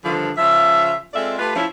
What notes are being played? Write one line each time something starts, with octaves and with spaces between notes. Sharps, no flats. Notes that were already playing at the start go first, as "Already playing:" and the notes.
G2 D3 D#3 F3
C#3 F3 F4 E5
G#3 C4 F4 A4 D5 E5
A3 F4 G4 B4
F3 C#4 E4